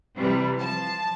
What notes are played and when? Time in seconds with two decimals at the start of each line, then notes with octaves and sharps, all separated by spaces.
0.16 C3 E3 G3
0.60 F3 A5